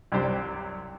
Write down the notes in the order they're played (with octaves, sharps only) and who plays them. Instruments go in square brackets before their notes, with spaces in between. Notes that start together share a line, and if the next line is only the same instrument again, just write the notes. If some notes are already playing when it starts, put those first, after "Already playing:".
[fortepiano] C2 F#2 C3 D4 G4 C5